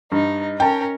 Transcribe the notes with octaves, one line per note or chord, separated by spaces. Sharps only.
G2 D#4
C#4 A#4 G5 A5